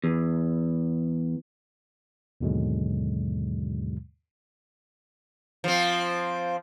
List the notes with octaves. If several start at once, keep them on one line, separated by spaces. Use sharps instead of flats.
E2
D#2 G#2 B2 D3 F#3 G#3
F3 C4